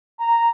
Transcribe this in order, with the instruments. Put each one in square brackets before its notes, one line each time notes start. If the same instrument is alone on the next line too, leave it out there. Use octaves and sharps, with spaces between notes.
[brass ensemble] A#5